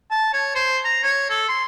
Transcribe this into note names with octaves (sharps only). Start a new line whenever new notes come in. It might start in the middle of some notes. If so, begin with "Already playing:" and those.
A5
C#5
C5
A#5
C#5
A4
C6